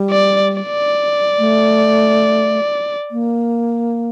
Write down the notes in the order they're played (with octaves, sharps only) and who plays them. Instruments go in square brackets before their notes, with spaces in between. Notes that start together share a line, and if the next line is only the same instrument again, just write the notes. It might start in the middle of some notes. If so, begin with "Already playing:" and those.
Already playing: [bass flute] G3
[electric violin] D5
D5
[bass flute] A3
A#3